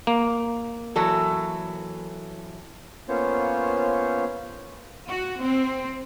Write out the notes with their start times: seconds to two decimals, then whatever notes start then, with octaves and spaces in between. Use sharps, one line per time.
0.07 A#3
0.96 E3 F#3 A4
3.09 A#3 B3 C#4 F4 C5 C#5
5.07 F#4
5.40 C4